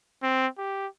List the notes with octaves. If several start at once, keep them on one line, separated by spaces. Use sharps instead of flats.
C4
G4